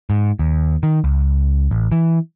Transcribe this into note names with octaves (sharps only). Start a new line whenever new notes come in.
G#2
D#2
D#3
C#2
A1
E3